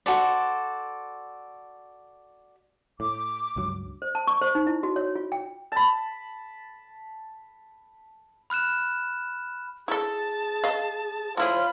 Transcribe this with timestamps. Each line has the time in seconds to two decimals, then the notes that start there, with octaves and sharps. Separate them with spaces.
0.06 F#4 A4 C5 D5
3.00 A2 D6
3.56 C#2 G2 F#3
4.02 C5
4.15 A5
4.27 C#6
4.41 C5
4.55 D#4
4.67 E4
4.83 F#4
4.96 C#5
5.15 F4
5.32 G5
5.72 A5 B5
8.50 B5 F6 F#6 E7
9.88 E4 G#4 A4 A5
10.64 D#5 F5
11.37 A3 E4 F4 G#4 C5 C#5 B5